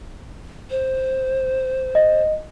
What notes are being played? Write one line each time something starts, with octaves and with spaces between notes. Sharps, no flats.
C5
D#5